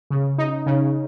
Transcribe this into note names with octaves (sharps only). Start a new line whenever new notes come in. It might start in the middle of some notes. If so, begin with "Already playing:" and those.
C#3
D#4
C#3